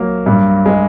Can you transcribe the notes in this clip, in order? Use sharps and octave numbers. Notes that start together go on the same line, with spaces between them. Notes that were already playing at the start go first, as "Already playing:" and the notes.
Already playing: F#3 A#3
G2
G#3